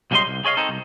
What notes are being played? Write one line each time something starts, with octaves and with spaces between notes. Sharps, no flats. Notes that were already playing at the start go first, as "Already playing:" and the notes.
B1 C#3 G3 D#4 D#5 C6
C2
G#4 C#5 D#5 F5
C4 D#4 A4
C2